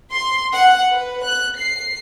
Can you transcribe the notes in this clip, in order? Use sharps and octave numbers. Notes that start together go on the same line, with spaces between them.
C6
F#5
B4
F#6
C7